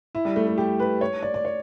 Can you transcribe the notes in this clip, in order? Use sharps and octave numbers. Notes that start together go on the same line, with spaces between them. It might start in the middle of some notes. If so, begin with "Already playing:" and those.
E4
G3
A3
A3
G4
B4
C#5
D5
D5
C#5